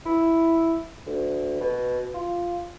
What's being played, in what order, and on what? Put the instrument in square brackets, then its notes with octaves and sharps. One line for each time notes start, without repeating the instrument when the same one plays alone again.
[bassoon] E4
D2
B2
F4